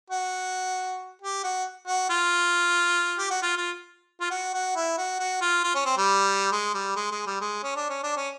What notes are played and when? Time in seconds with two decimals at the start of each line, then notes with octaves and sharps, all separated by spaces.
0.10 F#4
1.22 G4
1.44 F#4
1.87 F#4
2.10 F4
3.19 G4
3.31 F#4
3.42 F4
3.57 F4
4.21 F4
4.31 F#4
4.54 F#4
4.76 E4
4.98 F#4
5.19 F#4
5.41 F4
5.64 F4
5.75 C#4
5.85 C4
5.98 G3
6.52 G#3
6.74 G3
6.96 G#3
7.11 G#3
7.26 G3
7.41 G#3
7.63 C#4
7.76 D4
7.89 C#4
8.03 D4
8.16 C#4